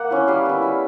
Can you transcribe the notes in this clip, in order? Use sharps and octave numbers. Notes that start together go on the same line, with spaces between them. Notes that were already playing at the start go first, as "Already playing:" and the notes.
Already playing: A#3 F#5
C#4 E4
G3 F5
B3 E4
G3